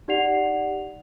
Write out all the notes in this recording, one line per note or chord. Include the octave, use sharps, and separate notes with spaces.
D#4 G4 D5 F#5 C7 F7